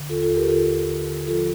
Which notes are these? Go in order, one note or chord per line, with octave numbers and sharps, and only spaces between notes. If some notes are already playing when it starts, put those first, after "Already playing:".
Already playing: D3
D#2 F4 A4
F4 A4
D#2
G4 A#4
D3 F4 A4
D#2
D3
D3
F3 F4 A4